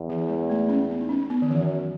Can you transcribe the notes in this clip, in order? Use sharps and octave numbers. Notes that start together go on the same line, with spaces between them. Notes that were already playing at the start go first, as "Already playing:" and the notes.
Already playing: E2
E3
G#3
A3
C#4
B3
D#4
C#4
B3
D#3
F#2 E3